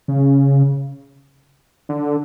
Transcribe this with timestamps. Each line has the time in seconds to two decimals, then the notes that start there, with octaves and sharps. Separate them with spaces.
0.08 C#3
1.89 D3